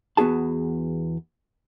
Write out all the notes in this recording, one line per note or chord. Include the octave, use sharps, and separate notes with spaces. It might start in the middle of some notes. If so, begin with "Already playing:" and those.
E2 B3 F#4 G#4 A5